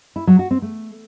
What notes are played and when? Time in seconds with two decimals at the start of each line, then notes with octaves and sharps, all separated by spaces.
0.16 E4
0.27 F#3
0.39 F#4
0.51 C4
0.62 A3